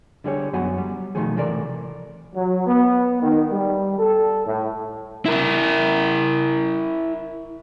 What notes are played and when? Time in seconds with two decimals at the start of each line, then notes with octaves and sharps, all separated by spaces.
0.24 D3 G3 G#4 C#5
0.53 F#2 F#3 B3 F#4 F#5 G#5
0.78 G3
1.15 B2 D#3 F3 F#3 A3 G#4
1.36 A2 C3 E3 A4 A#4 D5
2.35 F#3
2.67 B3
3.23 D#3
3.51 G3
3.99 A4
4.46 A2
5.26 E4 A#4